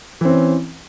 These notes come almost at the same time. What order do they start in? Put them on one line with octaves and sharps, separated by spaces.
E3 C4 C#4